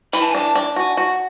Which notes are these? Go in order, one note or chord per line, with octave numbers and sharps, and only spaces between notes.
E3 B5
A5
G#5
D4 A5
D4
F#4 G#5
F#4